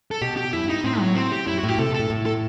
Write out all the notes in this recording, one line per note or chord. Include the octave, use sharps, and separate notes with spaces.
A4
B2 G4
G4
F#2 E4
G2
D#4
G2
A2 C4
F#3
C4
G4
F#2 E4
F#4
A2
G4
C3 A4
B2
A2 A4
A2
A4